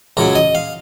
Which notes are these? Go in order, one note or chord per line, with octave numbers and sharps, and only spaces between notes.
C#2 C#3 F#3 A#4
D#5
F5